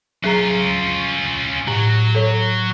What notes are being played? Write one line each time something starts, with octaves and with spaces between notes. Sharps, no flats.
F#3 C#4 F4 G#4 A#5
A2 F#3
A4 C#5